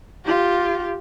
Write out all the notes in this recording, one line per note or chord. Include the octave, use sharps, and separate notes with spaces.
F4 G4